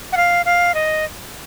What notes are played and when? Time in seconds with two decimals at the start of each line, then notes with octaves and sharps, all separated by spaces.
0.12 F#5
0.17 F5
0.46 F5
0.74 D#5